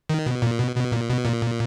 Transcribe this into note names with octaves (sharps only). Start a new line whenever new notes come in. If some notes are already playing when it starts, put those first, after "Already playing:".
D#3
B2
A#2
B2
B2
A#2
B2
A#2